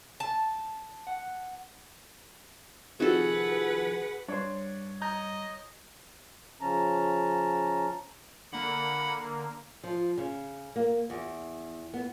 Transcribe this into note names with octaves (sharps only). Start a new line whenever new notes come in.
A5
F#5
C3 D#3 F3 F#4 G#4 A4 B4 F#5
G2 D4 C5 C#5
D#5 A#5 G6
C#3 F3 C#4 A5 A#5
D3 A#3 F#5 B5
F3
C#3
A#3
E2
B3